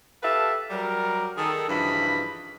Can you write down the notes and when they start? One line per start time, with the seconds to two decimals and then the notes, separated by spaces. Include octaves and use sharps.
0.23 G4 A4 B4 E5 F5 A5
0.70 F#3 G3 A#4
1.37 D#3 G#4 A4
1.69 G2 C#3 E3 F3 D#5 B5